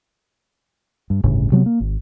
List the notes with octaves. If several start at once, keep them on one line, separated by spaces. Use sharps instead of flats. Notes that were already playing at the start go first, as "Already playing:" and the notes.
G2
G1 D2 A2 C#3
C3 F#3 G#3 B3
A#3
G#1